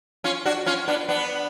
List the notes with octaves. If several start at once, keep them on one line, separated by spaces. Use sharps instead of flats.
C#4 F4
D4 F#4
C#4 F4
B3 D4
B3 D4